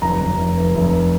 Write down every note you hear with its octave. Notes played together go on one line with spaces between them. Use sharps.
F1 A#5
F1
F1
F1
F1